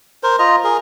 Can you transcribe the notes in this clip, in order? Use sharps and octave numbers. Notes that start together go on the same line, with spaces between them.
A#4 C5
F4 D#5 A#5
G#4 A#4